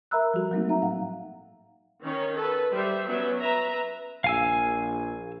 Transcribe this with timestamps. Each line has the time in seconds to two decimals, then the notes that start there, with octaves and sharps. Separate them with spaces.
0.11 A#4 E5 A#5 B5 E6 F#6
0.34 F3 G3 F#4 A4
0.51 F#3 G3 A3 A#3 C4 D#4
0.69 D#4 E5 F#5 A#5
0.82 A2 F5 F#5
2.02 D#3 C#4 C#5
2.37 A4 B4
2.71 G3 C5 E5
3.06 F#3 B3 C#4 B4 E5
3.39 B4 E5 A#5
4.24 A#1 F5 G#5 E6